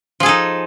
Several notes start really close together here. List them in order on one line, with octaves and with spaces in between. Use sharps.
F3 G#4 A4 D#4